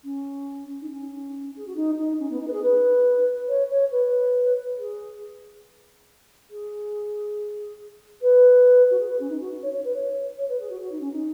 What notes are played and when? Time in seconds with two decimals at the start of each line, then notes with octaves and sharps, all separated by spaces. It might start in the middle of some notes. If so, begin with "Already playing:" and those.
0.03 C#4
0.81 D#4
0.89 C#4
1.56 G#4
1.66 F#4
1.75 D#4
1.98 D#4
2.19 C#4
2.29 B3
2.40 D#4
2.47 B4
2.52 G#4
2.62 B4
3.48 C#5
3.69 C#5
3.91 B4
4.78 G#4
6.50 G#4
8.21 B4
8.90 F#4
8.99 G#4
9.07 B4
9.19 C#4
9.29 D#4
9.40 F#4
9.62 C#5
9.73 C#5
9.84 B4
9.94 C#5
10.37 C#5
10.48 B4
10.59 G#4
10.69 F#4
10.80 F#4
10.91 D#4
11.00 C#4
11.11 D#4